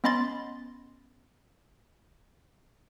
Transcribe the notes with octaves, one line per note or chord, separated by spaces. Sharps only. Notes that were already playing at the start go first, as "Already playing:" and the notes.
B3 C#4 D#5 B5 C6 A6